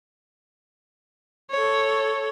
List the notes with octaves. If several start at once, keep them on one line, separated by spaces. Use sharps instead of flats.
A4 C#5